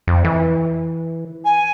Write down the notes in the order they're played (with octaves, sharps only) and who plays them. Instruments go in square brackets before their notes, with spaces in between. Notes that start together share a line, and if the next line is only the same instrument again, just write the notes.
[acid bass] F2
E3
[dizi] G#5